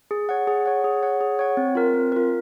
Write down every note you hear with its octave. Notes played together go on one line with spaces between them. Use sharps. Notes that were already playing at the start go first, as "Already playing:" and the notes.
G#4
C#5 F#5
G#4
C#5 F#5
G#4
C#5 F#5
G#4
C#5 F#5
C4
F4 A#4
C4
F4 A#4